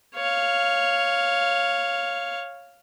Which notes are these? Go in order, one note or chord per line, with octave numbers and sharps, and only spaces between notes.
C#5 F5